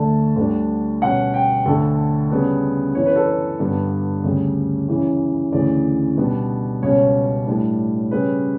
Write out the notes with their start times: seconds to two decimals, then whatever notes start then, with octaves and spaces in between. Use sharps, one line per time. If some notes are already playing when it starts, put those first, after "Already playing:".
Already playing: D2 D3 A3 D4 A5
0.36 D2 D3 G3 D4
1.02 B2 G3 C#4 F#5
1.34 G5
1.66 D2 D3 A3 A4
2.30 C#3 G3 B3 D4
2.95 F#2 E3 B3 D4 C#5
3.06 B4
3.16 A4
3.27 B4
3.60 G2 D3 G3 B3
4.24 D2 C#3 G3
4.88 F#2 C#3 E3
5.53 D2 C#3 E3 D5
6.17 B2 G3 B3 D4
6.82 C#2 B2 G3 C#4 C#5
7.47 A2 G3 D4
8.11 C#3 G3 C#4 B4